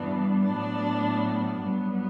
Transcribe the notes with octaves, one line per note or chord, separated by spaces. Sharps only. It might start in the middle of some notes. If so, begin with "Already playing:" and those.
Already playing: G2 E3 G3 B3 D4
A2 F#3 B3 D4
G2 F#3 B3